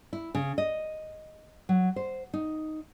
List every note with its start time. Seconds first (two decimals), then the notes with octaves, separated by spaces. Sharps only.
0.13 E4
0.35 C#3
0.58 D#5
1.69 F#3
1.96 C5
2.34 D#4